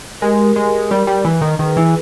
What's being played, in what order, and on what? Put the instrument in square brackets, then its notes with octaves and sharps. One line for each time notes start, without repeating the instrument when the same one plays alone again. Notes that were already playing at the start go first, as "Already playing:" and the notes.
[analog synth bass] G#3 [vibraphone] G4 A#4
[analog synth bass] G#3
G3
G3
E3
D#3
[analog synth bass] D#3 [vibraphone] G#4 B4
[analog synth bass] E3